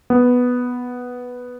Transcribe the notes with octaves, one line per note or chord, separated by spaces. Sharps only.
B3